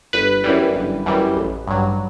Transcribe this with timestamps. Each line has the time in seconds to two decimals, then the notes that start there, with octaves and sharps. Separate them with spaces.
0.13 G1 B4
0.44 F#2 E3 G3
0.75 G1
1.06 F#2 E3 G3
1.36 A1
1.67 G2 F#3